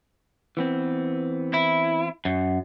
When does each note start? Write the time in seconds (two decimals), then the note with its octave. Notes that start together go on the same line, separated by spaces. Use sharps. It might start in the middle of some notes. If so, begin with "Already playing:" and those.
0.57 E3 B3 C4
1.54 E4
2.25 F#2